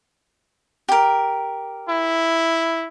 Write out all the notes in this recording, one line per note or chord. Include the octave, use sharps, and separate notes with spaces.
G4 A#4
E4